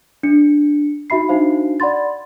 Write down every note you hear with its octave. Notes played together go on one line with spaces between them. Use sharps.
D4 C#7
D#4 F#4 E5 B5 C7
D4 D#4 F#4 C5 F5
D5 F#5 B5 C6 A6